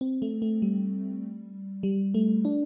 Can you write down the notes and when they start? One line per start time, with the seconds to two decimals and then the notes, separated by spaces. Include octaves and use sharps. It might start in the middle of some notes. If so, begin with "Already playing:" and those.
0.01 C4
0.22 A3
0.42 A3
0.62 G3
1.83 G3
2.14 A3
2.45 D4